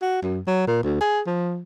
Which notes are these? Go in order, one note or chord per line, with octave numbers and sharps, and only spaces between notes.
F#4
F#2
F#3
A#2
D2
G#4
F3